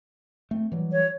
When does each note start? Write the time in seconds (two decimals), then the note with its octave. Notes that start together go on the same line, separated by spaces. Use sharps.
0.51 A3 C4
0.72 E3 F#3 G3
0.92 C#5